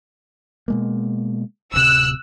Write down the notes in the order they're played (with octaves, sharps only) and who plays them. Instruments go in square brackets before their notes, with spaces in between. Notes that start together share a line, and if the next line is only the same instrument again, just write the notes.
[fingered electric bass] B2 G#3 A#3
[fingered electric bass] D1 C3 [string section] E6 F#6